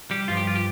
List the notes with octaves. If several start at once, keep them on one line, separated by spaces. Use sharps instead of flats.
G3 G4
G2 F3 F4
G4
F4
G4